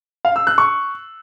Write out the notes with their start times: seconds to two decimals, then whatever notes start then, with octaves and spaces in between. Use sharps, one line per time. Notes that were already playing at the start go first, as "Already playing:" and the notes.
0.25 F5
0.36 E6
0.47 F#6
0.58 C#6